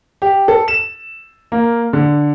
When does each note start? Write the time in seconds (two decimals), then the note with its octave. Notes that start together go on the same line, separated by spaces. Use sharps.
0.22 G4
0.48 A4
0.68 E7
1.52 A#3
1.93 D3